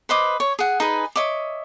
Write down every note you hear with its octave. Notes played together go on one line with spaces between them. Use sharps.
B4 C5 D#5 D6
C#5
G#4 F#5
D#4 G#4 B4
C#5 D#5 E5 D6